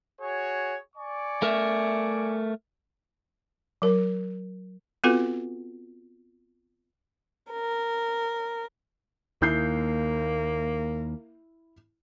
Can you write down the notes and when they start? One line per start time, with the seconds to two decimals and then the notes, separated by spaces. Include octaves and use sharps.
0.21 F#4 G#4 C#5
0.96 D5 G#5 C#6
1.42 A3 A#4 E5
3.82 F#3 A#4
5.04 B3 C4 F4 F#4 A4 B4
7.51 A#4
9.42 D#2 A#3 E4 G6 C7